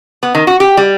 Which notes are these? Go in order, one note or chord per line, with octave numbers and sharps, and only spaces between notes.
B3
D#3
F#4
G4
G3